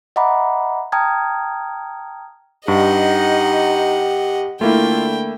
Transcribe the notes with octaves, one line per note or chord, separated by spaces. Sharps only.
D#5 E5 F#5 A#5 B5 D6
G5 A5 A#5 D#6 F6 G#6
G2 D#4 G4 D#5 F#5
D3 A3 A#3 E4 F4 G5